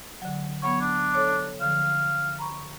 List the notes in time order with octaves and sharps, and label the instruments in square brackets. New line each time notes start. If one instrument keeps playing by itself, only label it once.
[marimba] D3 F#3
[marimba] F#3 B3 [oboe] C#5
[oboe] D4
[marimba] A4 C#5 D6
[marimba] D3 F3 [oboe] F5
[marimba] A#5 B5 C#6